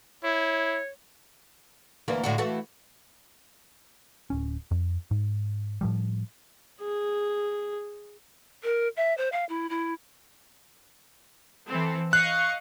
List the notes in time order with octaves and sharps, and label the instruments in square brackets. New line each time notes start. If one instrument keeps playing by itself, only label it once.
[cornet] E4 [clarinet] C#5
[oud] D2 E3 A#3
A2 D3 F#4
E3 A3 F#4
[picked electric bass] D1 C#4
F2
G#2
A2 F3 G3
[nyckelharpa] G#4
[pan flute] A#4
E5
C5
F5
E4
E4
[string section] E3 C4 A4
[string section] D#5 F5 C#6 [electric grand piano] F#6